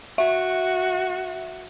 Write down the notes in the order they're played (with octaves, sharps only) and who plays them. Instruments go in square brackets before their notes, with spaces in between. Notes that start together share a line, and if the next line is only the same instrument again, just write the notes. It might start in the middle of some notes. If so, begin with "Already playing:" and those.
[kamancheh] F#4 [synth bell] E5